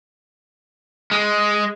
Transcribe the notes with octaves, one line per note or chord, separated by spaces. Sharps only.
G#3